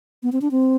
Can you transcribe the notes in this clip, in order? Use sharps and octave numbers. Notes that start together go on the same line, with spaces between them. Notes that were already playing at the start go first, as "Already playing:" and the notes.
B3
C4
D4
C4